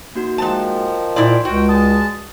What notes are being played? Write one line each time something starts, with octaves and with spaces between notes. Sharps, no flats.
A#3 D#4 F#4
D#3 F3 G#3 A5
A#2 E4 D5 C6 G6
C#2 F#4 G5
G#3 A5 D#6